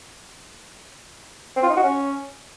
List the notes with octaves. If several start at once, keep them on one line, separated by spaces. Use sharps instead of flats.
C4
F4
D#4
F#4
C#4